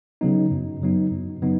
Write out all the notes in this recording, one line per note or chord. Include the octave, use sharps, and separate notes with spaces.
C#3 F#3 B3 D#4
F#2
C#3 F#3 B3 D#4
F#2
C#3 F#3 B3 D#4